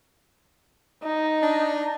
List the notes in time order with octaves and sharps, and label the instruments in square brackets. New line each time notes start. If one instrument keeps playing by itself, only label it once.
[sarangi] D#4
[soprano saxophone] D4